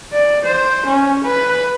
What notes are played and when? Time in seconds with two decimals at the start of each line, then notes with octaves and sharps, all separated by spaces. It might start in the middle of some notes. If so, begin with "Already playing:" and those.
0.13 D5
0.44 C5
0.86 C#4
1.24 B4